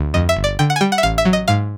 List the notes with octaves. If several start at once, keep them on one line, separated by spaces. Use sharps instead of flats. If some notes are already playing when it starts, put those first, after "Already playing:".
Already playing: D2
F2 D#5
E5
G1
D5
D3 G5
F#5
G#5
G3 G5
F#5
E5
A1 F5
E5
F#3
D#5
G#2 F5